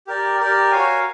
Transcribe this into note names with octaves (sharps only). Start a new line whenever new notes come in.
G4 A#4 D5
G4 A#4 D5
F#4 A#4 C#5 F5 G#5